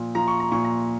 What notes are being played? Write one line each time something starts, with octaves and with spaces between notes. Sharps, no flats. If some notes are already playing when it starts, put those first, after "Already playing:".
Already playing: A#2 F3
F3 A#5
C#6
A#5
A#2 C#6
A#5